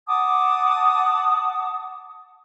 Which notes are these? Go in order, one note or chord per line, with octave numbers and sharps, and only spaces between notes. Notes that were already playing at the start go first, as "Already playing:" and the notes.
F#5 A5 D6 D#6